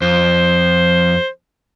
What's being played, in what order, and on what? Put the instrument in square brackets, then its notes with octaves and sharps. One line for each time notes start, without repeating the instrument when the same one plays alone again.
[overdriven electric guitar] F2 [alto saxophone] C5